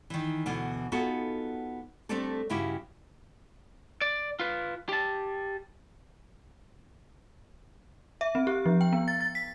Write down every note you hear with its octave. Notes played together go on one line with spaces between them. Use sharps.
D#3 E3
D2 B2 E3
B3 D#4 F4 F#4 G#4 A4
G3 A3 C4 D4 G4 A4
G2 C#3 E4 F#4 G4
D5
F4 B4
G4 A5
E5
C4
G4
F3
G5
B3
A6
A6
B6